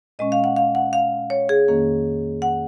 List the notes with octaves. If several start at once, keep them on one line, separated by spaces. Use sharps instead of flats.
A#2 G#3 C#4 D#5
F5
F#5
F5
F#5
F5
C#5
G#4
F2 D#3 A#3 C#4
F#5